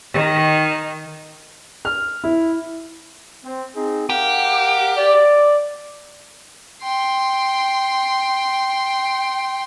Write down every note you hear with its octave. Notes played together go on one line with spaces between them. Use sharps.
D#3
F6
E4
C4
C4 D#4 G#4
G4 A#4 F5 F#5
D5
G5 C6